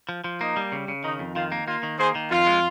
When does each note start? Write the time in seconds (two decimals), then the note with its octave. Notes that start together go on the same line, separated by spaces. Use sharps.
0.09 F3
0.24 F3
0.41 A#3 D#4
0.57 G3
0.72 C#3
0.88 C#3
1.04 D#3 D#4
1.19 F2
1.35 D#3 F4
1.52 A#3
1.67 A#3 F4
1.83 D#3
1.99 A#3 G#4 C5
2.15 D#3
2.31 F2 F4
2.47 G#3